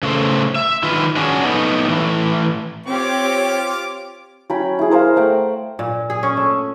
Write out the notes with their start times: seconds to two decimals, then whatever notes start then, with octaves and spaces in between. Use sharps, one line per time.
0.03 C#3 E3 A3 C5
0.56 E5
0.83 D#3 F4 B4
1.16 C#4 D4 F#4 G#4
1.44 A3 B3 D#4
1.89 A2 E3
2.86 C4 F4 G4 C#5 D6
4.50 F#3 C#4 G5 B5
4.79 E4 G#4
4.91 A#4 C5 F5 A#5
5.16 A3 F#5 G5
5.79 A#2
6.10 G#4
6.23 C#4
6.37 A3